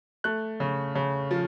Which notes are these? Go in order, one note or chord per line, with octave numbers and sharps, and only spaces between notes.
A3 F#6
C#3
C#3
F3